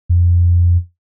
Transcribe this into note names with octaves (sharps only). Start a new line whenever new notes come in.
F2